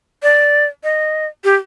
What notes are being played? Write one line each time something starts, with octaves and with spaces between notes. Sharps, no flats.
D5
D#5
G4